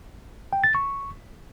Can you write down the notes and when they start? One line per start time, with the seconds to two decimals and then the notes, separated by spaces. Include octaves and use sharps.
0.53 G5
0.64 A6
0.75 C#6